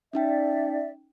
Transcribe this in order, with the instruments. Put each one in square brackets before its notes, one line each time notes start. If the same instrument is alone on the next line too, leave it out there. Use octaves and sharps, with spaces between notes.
[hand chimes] C#4 D#4 G5 [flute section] D5 E5